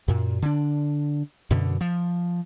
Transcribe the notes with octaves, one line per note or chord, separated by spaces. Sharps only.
F#2 A#2
D3 D4
F#2 B2 D3
F3